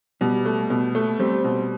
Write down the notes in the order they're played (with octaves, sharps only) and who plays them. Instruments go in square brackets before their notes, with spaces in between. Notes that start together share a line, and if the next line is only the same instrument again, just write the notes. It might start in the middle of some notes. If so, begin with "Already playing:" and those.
[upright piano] B2 [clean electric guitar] G3
[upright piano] A3
B2
A3
[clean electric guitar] G3 [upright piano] C4
[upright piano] B2